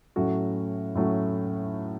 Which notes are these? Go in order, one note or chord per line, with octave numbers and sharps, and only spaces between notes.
A2 F#3 A3 C#4 F#4
A2 F#3 A3 C#4 F#4